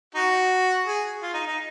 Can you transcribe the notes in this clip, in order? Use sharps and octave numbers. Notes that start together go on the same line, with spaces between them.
D#4 F#4
G#4
F4
D#4
D#4